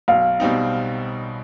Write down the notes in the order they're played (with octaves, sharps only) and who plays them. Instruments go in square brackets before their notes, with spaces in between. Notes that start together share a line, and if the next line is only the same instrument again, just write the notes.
[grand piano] B1 [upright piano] F5
[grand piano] B2 G3 C4 D#4